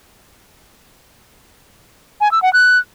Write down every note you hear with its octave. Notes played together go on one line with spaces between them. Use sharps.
G#5
E6
F#5
F#6